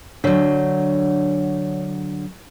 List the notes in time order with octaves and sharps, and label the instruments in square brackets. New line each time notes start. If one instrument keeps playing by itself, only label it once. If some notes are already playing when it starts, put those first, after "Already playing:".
[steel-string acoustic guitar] D3 F#3 [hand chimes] D4 C#5